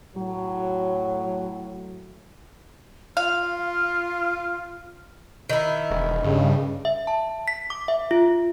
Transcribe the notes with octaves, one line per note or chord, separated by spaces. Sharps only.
A2 F#3
F4 F5 F6
D#3 E4
E1
G2 C#3
E5
A5
B6
D6
E5
F4